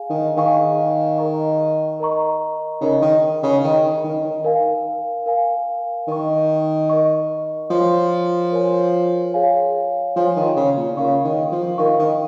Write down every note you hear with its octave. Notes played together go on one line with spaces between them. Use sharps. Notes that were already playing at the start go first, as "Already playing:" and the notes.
Already playing: G#4 F5 G#5
D#3
D#3 G#4 F5 G#5 C#6
A#4 D#5 A#5 C#6
A#4 D#5 A#5 C#6
C#3 D#4 A#4 D#5
D#3
C#3
D#3 D#4 A#4 D#5
D#3
D#3
A#4 F5 G#5
A#4 F5 G#5
D#3 A#4 D#5 C#6
A#4 D#5 C#6
F3 A#4 C#5 G#5
A#4 C#5 G#5
G#4 C#5 F5 G#5
F3 G#4 C#5 F5 G#5
D#3
C#3
A#2
C#3 A#4 F5 C#6
D#3
F3
D#3 A#4 F5 C#6
D#3